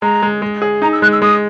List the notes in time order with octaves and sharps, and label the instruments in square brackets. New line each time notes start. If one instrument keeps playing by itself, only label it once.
[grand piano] G#3 [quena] A#5
[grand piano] G#3
G#3
G#4
[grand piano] D#4 [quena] A#5
[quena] E6
[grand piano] G#3 [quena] F#6
[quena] E6
[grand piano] G#3 [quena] D#6